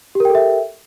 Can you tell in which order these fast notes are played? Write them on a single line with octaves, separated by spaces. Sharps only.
G4 A#4 G5 A4 E5